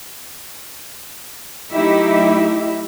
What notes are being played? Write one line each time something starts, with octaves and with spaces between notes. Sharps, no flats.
F#3 A3 D#4 E4 G4 E5